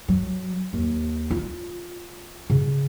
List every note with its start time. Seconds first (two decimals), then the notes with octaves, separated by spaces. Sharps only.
0.08 F#3
0.73 D#2
1.31 F4
2.50 C#3